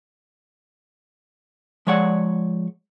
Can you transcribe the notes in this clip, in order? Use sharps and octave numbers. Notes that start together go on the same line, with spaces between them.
F3 G#3 C#5 D5 F#5